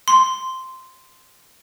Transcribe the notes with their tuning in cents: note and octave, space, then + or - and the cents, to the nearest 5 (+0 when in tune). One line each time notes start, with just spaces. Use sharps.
C6 -5